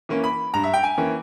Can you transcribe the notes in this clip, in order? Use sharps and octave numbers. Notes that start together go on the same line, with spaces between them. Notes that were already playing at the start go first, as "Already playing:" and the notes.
E3 A#3 C#4
B5
G2 A#5
E5
G5
G#5
E3 A#3 C#4